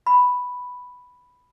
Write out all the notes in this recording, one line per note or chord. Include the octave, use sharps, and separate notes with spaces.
B5